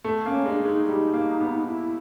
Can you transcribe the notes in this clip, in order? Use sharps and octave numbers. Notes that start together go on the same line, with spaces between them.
A3
A#3 C#4
G#3 D4
D4
G#3 D#4
G3 D#4
A#3
B3
D#4
E4